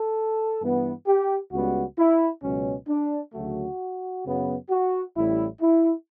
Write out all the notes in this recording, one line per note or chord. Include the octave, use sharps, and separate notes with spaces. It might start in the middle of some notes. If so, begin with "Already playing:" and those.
Already playing: A4
G2 E3 B3
G4
C#2 C#3 G3 B3 F#4
E4
C#2 B2 F#3 C#4
D4
D2 C#3 F#3 A3 F#4
F#2 C#3 F#3 B3
F#4
A1 A2 G3 E4
E4